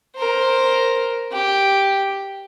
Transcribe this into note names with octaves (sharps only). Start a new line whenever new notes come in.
A#4 C5
G4